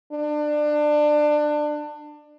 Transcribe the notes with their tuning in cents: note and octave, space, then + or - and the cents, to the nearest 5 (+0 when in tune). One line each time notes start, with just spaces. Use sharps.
D4 +25